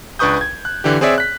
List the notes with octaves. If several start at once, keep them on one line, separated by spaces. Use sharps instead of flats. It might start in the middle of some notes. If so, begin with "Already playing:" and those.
C#2 D4 B4 C#6 D#6 G6
G#6
F#6
D3 E3 D4 G4
C4 G#4 C#5 D5 E5
F#6 B6